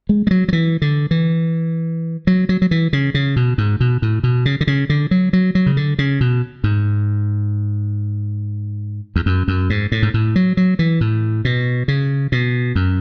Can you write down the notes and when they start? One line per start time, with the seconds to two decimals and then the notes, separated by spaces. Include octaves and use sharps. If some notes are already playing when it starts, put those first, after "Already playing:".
0.09 G#3
0.27 G#3
0.31 F#3
0.48 F#3
0.53 E3
0.82 D3
1.11 E3
2.27 F#3
2.49 F#3
2.62 F#3
2.71 E3
2.93 C#3
3.14 C#3
3.36 B2
3.58 G#2
3.80 B2
4.02 A2
4.23 B2
4.45 C#3
4.61 D3
4.67 C#3
4.89 D3
5.11 F#3
5.33 F#3
5.55 F#3
5.66 C#3
5.77 D3
5.99 C#3
6.21 B2
6.64 G#2
9.16 E2
9.26 F#2
9.48 F#2
9.70 G#2
9.92 A2
10.03 G#2
10.14 A2
10.36 F#3
10.57 F#3
10.79 E3
11.01 A2
11.45 B2
11.88 C#3
12.32 B2
12.76 F#2